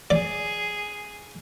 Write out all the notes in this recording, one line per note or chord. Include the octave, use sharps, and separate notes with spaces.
G#4 D5